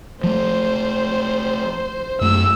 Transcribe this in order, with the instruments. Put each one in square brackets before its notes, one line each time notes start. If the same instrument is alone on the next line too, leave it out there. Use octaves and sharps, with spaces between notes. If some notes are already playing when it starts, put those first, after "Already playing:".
[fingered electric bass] F3 A3 [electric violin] C5
[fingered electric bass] F#2 A3 [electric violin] E6